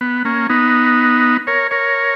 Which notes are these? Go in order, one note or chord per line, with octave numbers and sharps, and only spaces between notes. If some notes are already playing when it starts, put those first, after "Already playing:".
B3
A#3 C#4
B3 D#4
A#4 C#5
A#4 C#5